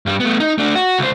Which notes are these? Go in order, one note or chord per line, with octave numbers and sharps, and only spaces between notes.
G2 G3
A3 B3
D#4
A3 D4
F#4
C#2 C5